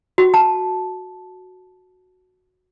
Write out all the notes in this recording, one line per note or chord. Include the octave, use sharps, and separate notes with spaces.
F#4
A5